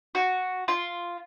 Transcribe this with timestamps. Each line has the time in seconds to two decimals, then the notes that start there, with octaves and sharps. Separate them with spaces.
0.15 F#4
0.68 F4